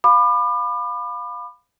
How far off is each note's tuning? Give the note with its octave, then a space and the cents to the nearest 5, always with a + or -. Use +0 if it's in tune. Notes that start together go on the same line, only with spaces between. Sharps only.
F5 +15 B5 +5 D6 +40